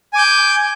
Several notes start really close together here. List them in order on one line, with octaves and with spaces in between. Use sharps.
G#5 D6 G6